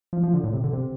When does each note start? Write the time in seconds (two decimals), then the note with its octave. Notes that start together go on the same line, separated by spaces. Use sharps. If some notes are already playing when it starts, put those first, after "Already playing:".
0.13 F3
0.23 F3
0.34 D3
0.44 A2
0.53 C3
0.64 D3
0.73 C3